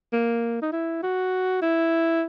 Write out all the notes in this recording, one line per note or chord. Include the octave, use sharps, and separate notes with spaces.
A#3
D#4
E4
F#4
E4